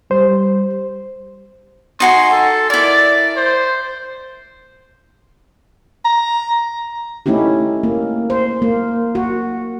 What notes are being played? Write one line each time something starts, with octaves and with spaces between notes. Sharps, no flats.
G3 C5
D#4 F#4 G#5 C6
A4
E4 A#4 D5
C5
A#5
A3 C#4 D#4 E4 G4
A#3
C5
A#3
F#4